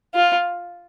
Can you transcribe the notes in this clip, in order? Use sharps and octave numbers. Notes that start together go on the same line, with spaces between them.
F4